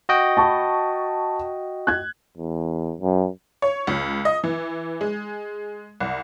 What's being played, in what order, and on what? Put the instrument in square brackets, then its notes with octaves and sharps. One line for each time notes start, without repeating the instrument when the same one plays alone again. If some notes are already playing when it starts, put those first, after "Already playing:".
[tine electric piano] F#4 D#5 G5
[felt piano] A5 B5 C#6
F#6 G#6
[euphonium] E2
F#2
[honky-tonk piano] C#5
C#2
D#5
E3
G#3
C2